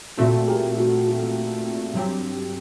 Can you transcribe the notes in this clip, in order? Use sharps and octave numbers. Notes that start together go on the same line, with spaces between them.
A#2 A3 C4 F#4 A4
G4 A#4
F#4 A4
F#4 A4
G2 F#3 C4 G4